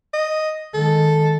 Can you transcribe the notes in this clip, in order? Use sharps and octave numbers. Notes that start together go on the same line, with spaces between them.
D#5
D#3 G#3 A4